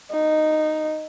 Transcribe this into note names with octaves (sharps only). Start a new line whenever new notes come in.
D#4